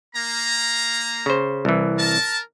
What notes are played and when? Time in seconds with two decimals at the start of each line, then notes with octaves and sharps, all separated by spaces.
0.14 A#3 A#5
1.26 C#3 C5
1.65 C2 E3
1.98 A#4 A5